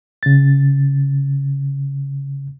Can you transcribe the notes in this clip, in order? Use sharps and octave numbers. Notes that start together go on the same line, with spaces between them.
C#3 A6